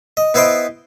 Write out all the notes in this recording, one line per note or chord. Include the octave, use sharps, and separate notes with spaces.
D#5
B3 E4 B4 C5 D#5 G5